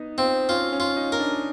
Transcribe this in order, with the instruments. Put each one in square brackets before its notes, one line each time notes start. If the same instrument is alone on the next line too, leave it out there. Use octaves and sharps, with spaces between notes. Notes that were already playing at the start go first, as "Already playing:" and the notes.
Already playing: [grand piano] B3 D#4
[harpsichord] C4 [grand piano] F4
[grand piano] C#4 [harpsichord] F4
[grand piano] C#4
[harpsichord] F4
[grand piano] D#4
[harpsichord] A#4
[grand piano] D4